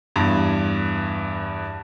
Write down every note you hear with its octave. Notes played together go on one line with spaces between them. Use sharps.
E2 G2